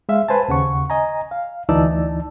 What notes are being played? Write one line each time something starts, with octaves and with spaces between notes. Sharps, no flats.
G#3 E5 F5
B4 C5 G#5 A5
D#2 C#3 F#5 C#6
D#5 G#5 A#5
F5
D2 E3 D#4 D5 A5 E6